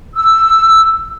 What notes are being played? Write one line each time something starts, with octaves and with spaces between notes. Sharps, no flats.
E6